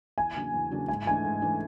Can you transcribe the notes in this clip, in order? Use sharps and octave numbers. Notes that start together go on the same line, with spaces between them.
E2 G#5
C#3 F#3 A#3 D4
E2
C#3 F#3 A#3 D4
G#2 G#5
E3 A3 D4 G#5
G#2
E3 A3 D4